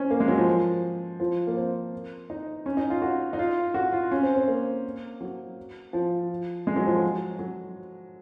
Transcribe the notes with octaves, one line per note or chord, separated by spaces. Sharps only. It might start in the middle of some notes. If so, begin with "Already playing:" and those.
Already playing: C4 C#4
A#3
G#3
F#3
F3
F3
A#3
C4
D#4
C#4
D#4
F4
F#4
D#4
F4
F#4
F4
C#4
C4
C4
A#3
F#3
F3
G#3
F#3
F3
F#3
F#3